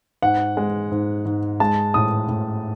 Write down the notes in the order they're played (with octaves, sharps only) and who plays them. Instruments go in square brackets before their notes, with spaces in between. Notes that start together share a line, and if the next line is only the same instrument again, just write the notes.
[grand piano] G#2 F#5
G#3
G#2
G#2
G#3 A5
A2 D#6
A2